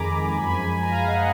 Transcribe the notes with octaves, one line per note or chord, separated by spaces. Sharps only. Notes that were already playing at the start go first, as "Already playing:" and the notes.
Already playing: F2 D#3 G#3 G#5 A#5 B5 D6
F#2 F3 G#3 G#5 B5
G#5
A#5
F5 G#5
D#5 F#5